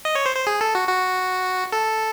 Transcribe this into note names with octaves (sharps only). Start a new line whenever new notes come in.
D#5
C#5
C5
C5
G#4
A4
F#4
F#4
A4